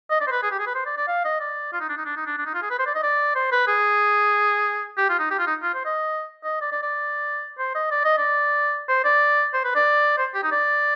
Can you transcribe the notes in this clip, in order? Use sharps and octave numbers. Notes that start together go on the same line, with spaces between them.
D#5
D5
C5
B4
G#4
G4
G#4
B4
C5
D5
D5
F5
D#5
D5
F4
D#4
D4
D#4
D4
D#4
D4
D4
D#4
F4
G#4
B4
C5
D5
D#5
D5
C5
B4
G#4
G4
F4
D#4
G4
F4
D#4
F4
C5
D#5
D#5
D5
D5
D5
C5
D#5
D5
D#5
D5
C5
D5
C5
B4
D5
C5
G4
D#4
D5